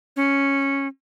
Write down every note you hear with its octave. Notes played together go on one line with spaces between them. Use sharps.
C#4